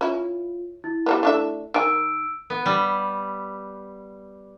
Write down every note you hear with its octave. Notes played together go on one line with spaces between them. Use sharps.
C#4 E4 F4
E4
G3 A#3 B3
A3 D4 E5
D#3 G#5 E6 D7
B3
G3